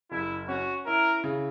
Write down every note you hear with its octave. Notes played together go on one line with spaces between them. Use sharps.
F#1 E4
C#4 F#4
E4 A#4
C#3